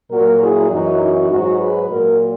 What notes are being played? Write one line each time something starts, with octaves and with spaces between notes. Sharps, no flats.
A#2 F#3 F#4 A#4
E4 G#4
F#2 E3 D#4 F#4
D#4 F#4
G#2 F#3 D#4 F#4
G#4 B4
A#2 F#3 F#4 A#4